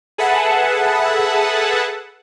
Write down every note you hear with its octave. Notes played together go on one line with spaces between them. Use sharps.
G#4 A4 B4 E5 F#5 A5